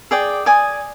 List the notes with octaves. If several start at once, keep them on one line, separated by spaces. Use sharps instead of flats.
G#4 D5 G5
D5 G#5 D#6